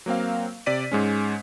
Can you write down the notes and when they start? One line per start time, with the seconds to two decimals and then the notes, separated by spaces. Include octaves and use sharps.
0.06 F#3 A#3 C4 F5
0.66 C3 D5 B6 D#7
0.92 G#2 G#3 C#4